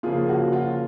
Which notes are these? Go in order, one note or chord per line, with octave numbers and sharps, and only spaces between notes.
C#3 F3 A#3 F4 G#4
F#4
F4